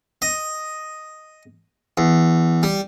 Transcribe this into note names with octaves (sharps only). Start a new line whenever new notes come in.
D#5
E2
G3